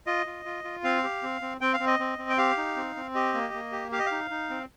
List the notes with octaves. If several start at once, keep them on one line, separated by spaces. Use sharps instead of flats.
F4 D#5
F4
F4
F4
C4 F5
G4
C4
C4
C4 G5
F5
C4
D#5
C4
C4
G5
G4 F5
D#4
C4
C4
G4 D#5
A#3
A#3
G4
G4 F5
D#5
F5
D#4
D#4
C4